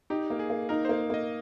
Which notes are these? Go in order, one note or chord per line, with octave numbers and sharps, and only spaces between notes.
D#4 G4
A#3
G#4
A#3
D#4 A#4
A#3 C5
A#3 D#5